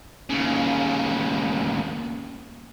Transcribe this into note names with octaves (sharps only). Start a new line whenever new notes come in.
D#2 C#3